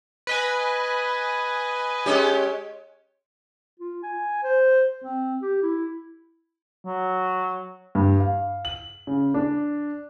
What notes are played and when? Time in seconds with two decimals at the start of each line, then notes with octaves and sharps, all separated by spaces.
0.27 B4 D#5 G#5
2.06 G#3 C#4 G4
3.80 F4
4.03 G#5
4.43 C5
5.04 C4
5.42 G4
5.63 E4
6.85 F#3
7.95 G2
8.20 F5
8.65 F#7
9.07 C#3
9.34 D4